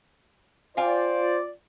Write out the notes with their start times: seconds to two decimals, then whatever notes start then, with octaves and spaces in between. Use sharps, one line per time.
0.77 F4 C5 D5 F5 G5 G#5